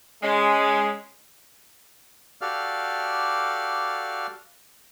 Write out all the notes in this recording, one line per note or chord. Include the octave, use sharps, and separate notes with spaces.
G#3 C#4
F#4 G4 A4 D5 F5 F6